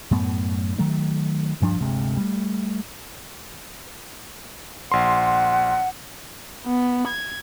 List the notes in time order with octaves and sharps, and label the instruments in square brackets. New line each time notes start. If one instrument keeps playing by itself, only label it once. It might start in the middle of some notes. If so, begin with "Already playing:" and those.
[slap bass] F#2 A2 B3
D#3 F#3 A3
D2 G2 F3 D4
G1 D2 C3 G#3
G3 A3
[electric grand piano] A#1 C6 [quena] F#5
[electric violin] B3
G#6